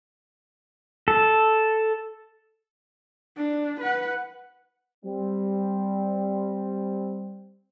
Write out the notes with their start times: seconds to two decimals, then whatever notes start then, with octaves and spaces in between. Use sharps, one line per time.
1.08 A4
3.37 D4
3.81 B4 F#5
5.05 G3 C4